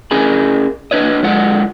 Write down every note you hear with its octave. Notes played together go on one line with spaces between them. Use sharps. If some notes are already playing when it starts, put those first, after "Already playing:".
C#4 G#4 A#4 G#5 B5
D4 B4 C#5 D#5
D3 G#3 F4 F#5